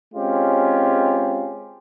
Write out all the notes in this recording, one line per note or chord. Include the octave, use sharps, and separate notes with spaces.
G#3 C4 C#4 F4 G4